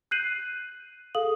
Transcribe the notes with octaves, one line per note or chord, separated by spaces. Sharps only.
F#6 G6 C7 D#7 F#7
G#4 A4 F5 D#6 F#7